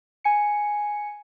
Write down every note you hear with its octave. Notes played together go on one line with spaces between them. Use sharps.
G#5 C#7